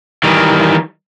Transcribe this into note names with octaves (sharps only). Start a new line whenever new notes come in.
D#3 E3 G3